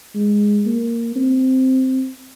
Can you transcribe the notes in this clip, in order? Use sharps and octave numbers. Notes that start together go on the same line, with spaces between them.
G#3
A#3
C4